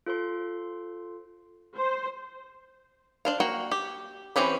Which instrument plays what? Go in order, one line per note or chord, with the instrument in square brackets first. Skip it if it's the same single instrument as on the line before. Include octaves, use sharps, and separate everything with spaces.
[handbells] F4 A4 C5 C6
[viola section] C5
[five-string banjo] D4 C5 F5
A#3 F#4 G5
G4
E3 C4 C#4 G4 B4